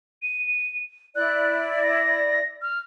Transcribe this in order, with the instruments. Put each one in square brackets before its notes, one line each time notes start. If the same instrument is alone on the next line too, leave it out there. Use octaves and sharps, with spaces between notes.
[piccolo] D#7
[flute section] E4 D5 [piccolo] F#6
[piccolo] A#6
F6